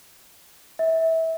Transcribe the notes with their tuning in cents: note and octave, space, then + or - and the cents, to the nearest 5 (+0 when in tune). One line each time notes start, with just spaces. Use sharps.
E5 -25